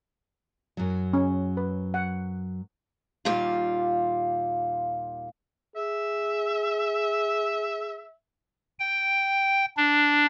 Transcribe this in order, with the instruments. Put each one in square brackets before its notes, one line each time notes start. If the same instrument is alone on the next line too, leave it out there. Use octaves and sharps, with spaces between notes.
[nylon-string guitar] F#2 F#3
[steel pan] C#4
B4
F#5
[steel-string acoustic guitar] D#2 A#2 G3 F4
[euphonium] G#4 [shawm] E5
[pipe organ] G5
D4